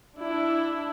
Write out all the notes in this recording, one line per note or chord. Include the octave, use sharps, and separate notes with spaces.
D4 E4